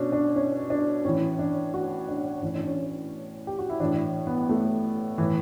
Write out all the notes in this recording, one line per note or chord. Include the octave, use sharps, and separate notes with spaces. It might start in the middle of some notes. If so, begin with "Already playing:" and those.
Already playing: B2 C#4 D4
D4
C#4
D4
A2 E3 C#4
D4
F#4
D4
A2 E3 C#4
D4
C#4
G4
F#4
E4
A2 E3 D4
B3
A3
A2 E3